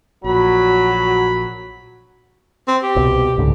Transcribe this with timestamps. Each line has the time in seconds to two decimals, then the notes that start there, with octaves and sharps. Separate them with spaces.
0.24 A#1 A#2 F#3 F#4 B5
2.68 C4
2.83 G4
2.96 C2 B2
3.38 C#2 G#2 D3